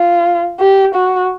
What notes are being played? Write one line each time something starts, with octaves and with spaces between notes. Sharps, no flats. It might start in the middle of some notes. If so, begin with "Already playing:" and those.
Already playing: F4
G4
F#4